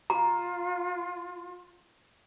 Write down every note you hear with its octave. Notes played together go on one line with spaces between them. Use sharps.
F4 A#5